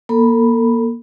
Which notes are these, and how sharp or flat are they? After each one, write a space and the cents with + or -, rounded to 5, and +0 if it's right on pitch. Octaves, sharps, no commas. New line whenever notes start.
A#3 +25 A4 +35 B5 +0